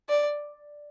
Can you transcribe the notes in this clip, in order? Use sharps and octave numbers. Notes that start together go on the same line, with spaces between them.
D5